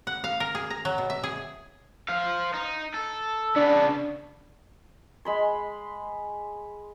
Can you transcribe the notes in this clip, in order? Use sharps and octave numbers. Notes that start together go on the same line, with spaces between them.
F#5
F5
A#4
G#4
A#5
F#3
B2
E5
G#4
C5 F5
D#4
A4
C#3 B3 D4
G#3 B5 C6